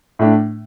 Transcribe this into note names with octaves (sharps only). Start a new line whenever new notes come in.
A2 A3 D4